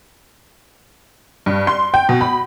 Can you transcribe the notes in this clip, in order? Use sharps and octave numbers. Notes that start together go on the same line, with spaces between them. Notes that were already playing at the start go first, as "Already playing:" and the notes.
G2
C6
G5
B2
B5